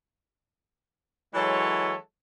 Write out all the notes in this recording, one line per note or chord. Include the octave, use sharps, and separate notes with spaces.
E3 F#3 G#3 A4 C#5